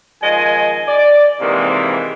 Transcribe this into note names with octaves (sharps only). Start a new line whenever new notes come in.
D#3 F3 G#3 D#5 G#5
D5
G#2 C3 D#3 E3 G#3 A#3